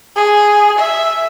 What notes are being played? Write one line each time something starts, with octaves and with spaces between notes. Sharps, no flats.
G#4
E5